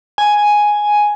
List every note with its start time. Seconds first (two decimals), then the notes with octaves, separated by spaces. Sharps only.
0.18 G#5